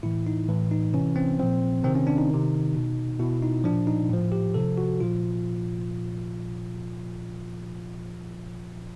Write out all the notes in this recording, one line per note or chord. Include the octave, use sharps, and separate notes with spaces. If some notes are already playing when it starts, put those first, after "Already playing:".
A2 E3 E4
D#4
A2 E3
D#4
C3 E3 C#4
C4
A#2 F3 C4
C3 D#3 C4
C#4
D4
D#4
C3 D#3
B2
B2 E4
D#4
A#2 F3 D4
D#4
A2 F3
G4
C3 F3 A4
F#4
A#2 F3 F4